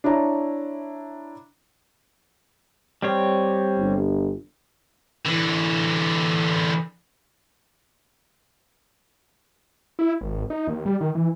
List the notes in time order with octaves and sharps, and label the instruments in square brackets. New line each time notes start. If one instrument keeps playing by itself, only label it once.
[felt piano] D4 E4 C#5 A#5
[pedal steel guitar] G3 C4 C#5
[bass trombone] G1
[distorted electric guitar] D3 E3
[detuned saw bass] E4
G#1
D#4
D#2
G3
D#3
E3